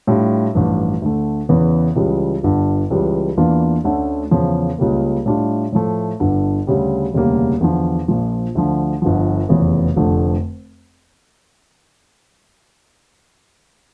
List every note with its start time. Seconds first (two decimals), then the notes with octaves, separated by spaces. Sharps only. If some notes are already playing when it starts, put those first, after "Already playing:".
0.07 A2 G3 D4 F4
0.55 A1 G2 F3
1.02 D2 D3 A3
1.49 E2 C#3 E3
1.96 C#2 C#3 E3 G3
2.43 G1 G2 D3
2.90 C#2 C#3 E3 G3
3.37 E2 E3 A#3 D4 F4
3.84 D2 D3 A3 C#4
4.31 E2 C#3 F3
4.78 C#2 C#3 G3 A#3
5.26 A2 G3 D4 F4
5.72 A2 F3 A3
6.20 G1 G2 D3
6.67 D2 C#3 G3
7.13 E1 D2 C#3 G3 A#3
7.61 E2 D3 F3
8.08 A#1 A#2 F3
8.55 D2 D3 F3
9.02 G1 G2 D3 F3
9.49 F1 E2 C#3 E3
9.96 F1 F2 D3 A3